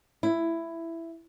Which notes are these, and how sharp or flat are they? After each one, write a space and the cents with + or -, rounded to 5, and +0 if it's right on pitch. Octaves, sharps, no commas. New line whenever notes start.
E4 +10